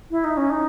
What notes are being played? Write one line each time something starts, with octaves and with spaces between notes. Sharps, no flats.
E4
D#4
C#4
D#4